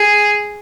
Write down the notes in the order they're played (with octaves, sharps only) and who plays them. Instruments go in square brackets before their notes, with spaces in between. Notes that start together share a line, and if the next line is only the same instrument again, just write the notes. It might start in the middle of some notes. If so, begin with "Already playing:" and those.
Already playing: [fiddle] G#4